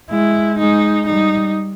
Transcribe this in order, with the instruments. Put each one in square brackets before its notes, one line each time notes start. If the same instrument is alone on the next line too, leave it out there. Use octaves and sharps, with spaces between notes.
[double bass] G#3 [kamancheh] E4
[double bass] G#3 [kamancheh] D#4
[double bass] G3 [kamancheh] D#4